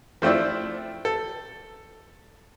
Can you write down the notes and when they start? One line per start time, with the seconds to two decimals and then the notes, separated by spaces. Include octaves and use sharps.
0.22 F3 A3 C4 D4 E4
1.05 A4